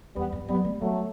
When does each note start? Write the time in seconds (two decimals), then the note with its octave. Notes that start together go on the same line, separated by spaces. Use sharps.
0.16 E2 G3 B3
0.32 G2
0.48 F#3 G3 B3
0.65 A3
0.81 F#3 G3 A3